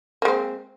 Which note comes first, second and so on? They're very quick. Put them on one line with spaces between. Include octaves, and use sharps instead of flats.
A#3 G#3 C4